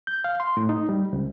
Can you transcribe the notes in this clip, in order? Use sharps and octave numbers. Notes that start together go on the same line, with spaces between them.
G6
F5
C6
A2
D#4
G3
C#2